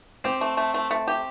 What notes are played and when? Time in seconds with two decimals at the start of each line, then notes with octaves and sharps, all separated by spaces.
0.24 C4 G4
0.41 A3
0.57 A3
0.74 A3
0.91 A3
1.07 G4